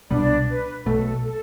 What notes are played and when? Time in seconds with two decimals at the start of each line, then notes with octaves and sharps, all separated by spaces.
0.10 C2 B2 G3 B3 D4 D5
0.48 B4
0.86 B1 B2 A3 A4
1.24 A4